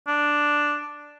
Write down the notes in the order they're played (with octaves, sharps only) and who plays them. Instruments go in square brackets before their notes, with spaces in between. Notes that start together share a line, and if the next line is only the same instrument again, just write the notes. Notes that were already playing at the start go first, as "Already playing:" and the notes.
[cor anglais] D4